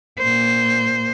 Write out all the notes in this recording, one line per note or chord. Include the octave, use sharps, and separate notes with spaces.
A#2 C5